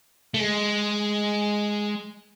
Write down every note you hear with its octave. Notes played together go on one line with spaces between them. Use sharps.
A3
G#3